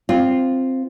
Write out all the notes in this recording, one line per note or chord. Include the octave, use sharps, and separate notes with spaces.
C4 F4